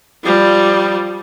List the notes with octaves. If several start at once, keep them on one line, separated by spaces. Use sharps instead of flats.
F3 G3